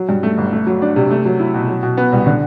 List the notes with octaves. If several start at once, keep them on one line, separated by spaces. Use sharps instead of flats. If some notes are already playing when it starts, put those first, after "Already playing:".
Already playing: F#3
G2
A3
G1
A3
F#3
D4
C3
A3
F#3
E4
B2
F#3
B2
B3
C2
D3